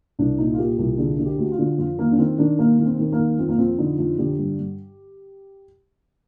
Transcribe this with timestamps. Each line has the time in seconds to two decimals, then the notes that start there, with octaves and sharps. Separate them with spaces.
0.19 C2 D4
0.38 A#2 D#4
0.54 F4
0.59 A#2 G4
0.79 C2 G4
0.98 D3 G#4
1.19 D3
1.26 G4
1.39 D2
1.52 F4
1.59 D3
1.78 F2 F4
1.99 D#3 A#3
2.12 D4
2.18 D#3 C4
2.38 D#3 D4
2.59 D#2 A#3
2.79 D#3
2.86 C4
2.99 D#3
3.12 A#3
3.19 D#2
3.38 F2 C4
3.49 A#3
3.58 F2 C4
3.78 D3 D#4
3.98 F2
4.19 D3 G4
4.39 G2
4.59 G2